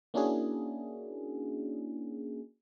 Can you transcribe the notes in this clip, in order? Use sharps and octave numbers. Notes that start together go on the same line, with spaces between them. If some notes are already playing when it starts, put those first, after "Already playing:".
A#3 C#4 D4 E4 F#4 G#4